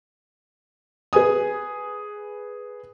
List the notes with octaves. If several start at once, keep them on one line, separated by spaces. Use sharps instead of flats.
G#4 B4 G#5 D#6